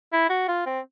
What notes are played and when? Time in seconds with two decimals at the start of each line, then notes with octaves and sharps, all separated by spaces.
0.13 E4
0.30 F#4
0.48 F4
0.66 C4